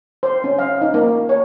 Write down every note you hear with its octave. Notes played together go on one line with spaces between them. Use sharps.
C5
C#4
F5
D#4
A#3
C#5